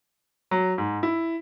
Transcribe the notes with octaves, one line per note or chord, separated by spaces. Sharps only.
F#3
G#2
E4